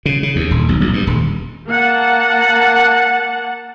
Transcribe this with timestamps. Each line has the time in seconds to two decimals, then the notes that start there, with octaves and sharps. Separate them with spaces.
0.06 C#3
0.23 C#3
0.36 D#2
0.51 D#1
0.69 B1
0.81 A#1
0.94 G2
1.07 D#1
1.67 A#3 F#5 A5